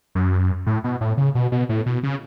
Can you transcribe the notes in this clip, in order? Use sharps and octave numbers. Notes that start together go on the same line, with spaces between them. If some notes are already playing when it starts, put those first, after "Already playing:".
F#2
A2
B2
A2
C#3
B2
B2
A2
B2
C#3